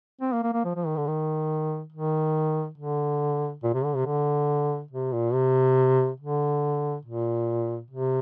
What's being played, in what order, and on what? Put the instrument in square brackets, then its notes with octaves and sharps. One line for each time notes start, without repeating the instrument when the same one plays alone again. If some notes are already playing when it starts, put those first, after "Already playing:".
[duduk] C4
A#3
A#3
A#3
F3
F3
D#3
D3
D#3
D#3
D3
A#2
C3
D3
C3
D3
C3
A#2
C3
D3
A#2
C3